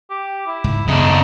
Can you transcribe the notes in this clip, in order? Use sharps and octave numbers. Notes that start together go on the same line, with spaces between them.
G4
E4
C#2 G#2
F#2 C#3 B3 D4 D#4